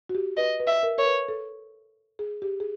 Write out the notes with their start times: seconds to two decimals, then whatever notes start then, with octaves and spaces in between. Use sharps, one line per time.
0.09 F#4
0.15 G4
0.37 B4 D#5
0.60 B4
0.67 E5
0.83 A#4
0.98 A#4 C#5
1.05 B4
1.28 A4
2.19 G#4
2.42 G4
2.60 G#4